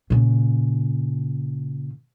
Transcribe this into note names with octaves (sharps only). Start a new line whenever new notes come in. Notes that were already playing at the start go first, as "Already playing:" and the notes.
A#2 C#3